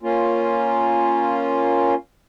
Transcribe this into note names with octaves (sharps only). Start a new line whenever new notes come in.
A#3 C#4 F4